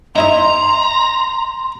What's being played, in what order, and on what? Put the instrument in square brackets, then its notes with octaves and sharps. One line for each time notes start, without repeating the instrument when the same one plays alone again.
[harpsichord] D#4 E4 D#5 [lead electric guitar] A#5 [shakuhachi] C6